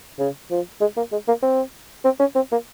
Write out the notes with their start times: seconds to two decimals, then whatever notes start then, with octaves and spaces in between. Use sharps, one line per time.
0.19 C#3
0.51 F3
0.81 G#3
0.97 A#3
1.12 G#3
1.28 A#3
1.42 C4
2.04 C4
2.20 C#4
2.35 C4
2.52 A#3